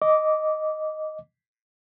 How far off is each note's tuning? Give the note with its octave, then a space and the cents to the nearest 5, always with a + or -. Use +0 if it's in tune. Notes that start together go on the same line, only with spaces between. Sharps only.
D#5 +0 D6 -15